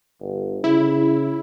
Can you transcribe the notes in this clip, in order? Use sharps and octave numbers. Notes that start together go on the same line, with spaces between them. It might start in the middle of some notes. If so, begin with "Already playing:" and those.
G1
C#3 E4